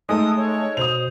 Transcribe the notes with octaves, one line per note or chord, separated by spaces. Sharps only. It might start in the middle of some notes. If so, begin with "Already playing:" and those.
G#3 A3 D#4 A4 D#6
C#5
B2 C5 D#6 F7